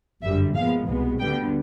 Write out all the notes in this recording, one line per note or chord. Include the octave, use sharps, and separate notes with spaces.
G1 F#2 D3 G3 E5
A#2 F3 G#3 B3 F5
C2 B2 G#3 B3
D2 D3 G3 B3 G5